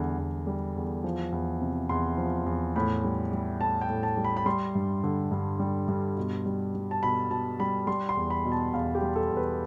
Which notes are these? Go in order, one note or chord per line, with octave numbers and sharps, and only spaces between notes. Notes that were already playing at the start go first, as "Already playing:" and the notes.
Already playing: E2 D3 G3
E2
G3
E2
F3
E2
C3
E2 C6
F3
E2
A2 B5
G3
G3
A2 A5
G5
A2
A5
G3
B5
B5
G3 C6
G2
D3
G2
G3
G2
B2
G3
G3
A5
B2 B5
B2 A5
G3 B5
G3 C6
C6
E2
B5
B2
A5
E2 F5
G4
G3
A4
E2
B4